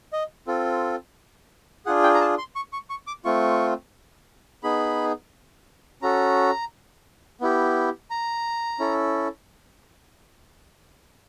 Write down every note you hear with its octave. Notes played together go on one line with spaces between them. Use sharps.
D#5
C4 F4 A4
D4 F4 G#4 F#5
G5
A#5
A5
C6
C#6
C#6
C#6
D6
A3 C4 F4 C#6
B3 D#4 G#4 B5
C#4 F#4 A4 A#5
B3 E4 G4
A#5
C#4 E4 A4